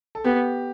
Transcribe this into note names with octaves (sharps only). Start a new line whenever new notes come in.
A4
B3 G4